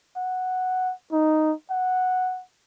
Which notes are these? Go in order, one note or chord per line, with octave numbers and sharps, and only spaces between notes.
F#5
D#4
F#5